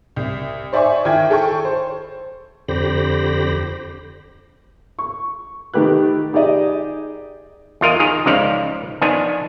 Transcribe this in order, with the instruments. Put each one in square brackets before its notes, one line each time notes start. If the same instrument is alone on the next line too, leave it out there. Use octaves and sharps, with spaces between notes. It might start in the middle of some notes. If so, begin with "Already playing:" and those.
[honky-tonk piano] C2
C5 D5 E5 G#5 C#6
D#3 E4 G5 G#6
G#4 A4 G5 C#6
C5
[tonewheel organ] F2 D3 G4 C5 B5 A#6
[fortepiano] C#6
D#3 A3 G4 B4 F#6
D#4 G4 G#4 D5 D#5
[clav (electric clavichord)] E2 F4 A#4 D#5
D#3 G#4 A#5
C#2 C#3 F3 D#4 D5 F5
D#3 F3 B3 D4 G#5